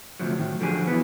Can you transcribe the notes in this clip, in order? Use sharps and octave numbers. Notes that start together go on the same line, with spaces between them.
D2 C3 F3 F#3
A2 D#3
D3 F3 F#3 G4 G#4
F2 E3 B3